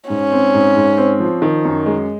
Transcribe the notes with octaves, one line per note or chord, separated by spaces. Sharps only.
G#2 C#4
C4
G#2
G#2
C4
F3
D#3
F#2
G#3